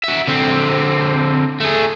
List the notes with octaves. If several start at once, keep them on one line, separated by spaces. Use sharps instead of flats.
F#4 E5
D3 C4
A3 G#4